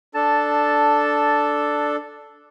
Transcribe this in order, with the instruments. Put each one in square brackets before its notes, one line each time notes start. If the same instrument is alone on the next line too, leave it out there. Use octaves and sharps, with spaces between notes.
[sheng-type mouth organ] D4 A4 [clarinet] A5